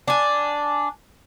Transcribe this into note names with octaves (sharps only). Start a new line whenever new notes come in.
D4 G#5